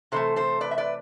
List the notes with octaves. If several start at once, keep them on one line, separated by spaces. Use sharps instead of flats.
C3 E3 A3 A4 C5
A4 C5
B4 D5
E5
B4 D5